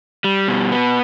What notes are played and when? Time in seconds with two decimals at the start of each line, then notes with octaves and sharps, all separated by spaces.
0.24 G3
0.48 B2
0.72 B3